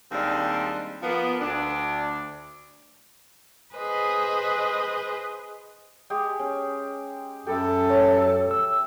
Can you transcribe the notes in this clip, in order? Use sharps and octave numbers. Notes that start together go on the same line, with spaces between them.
D#2 G3 G#3 C4 D4
F3 A#3 B3
D2 D4
G#4 B4 C5 D#5
G#3 G4 G#4
C#4
F#2 G4 A4 B4 E5
C#5
E6